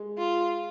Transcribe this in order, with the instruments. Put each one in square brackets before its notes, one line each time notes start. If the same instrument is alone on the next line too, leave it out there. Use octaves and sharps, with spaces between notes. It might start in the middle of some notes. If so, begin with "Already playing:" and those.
Already playing: [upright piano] G#3
[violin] F4